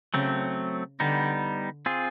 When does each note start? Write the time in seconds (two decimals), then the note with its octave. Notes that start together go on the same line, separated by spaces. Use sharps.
0.14 C#3 F#3 A3 C4
1.00 D3 G3 B3 D#4
1.86 C4 F4 G#4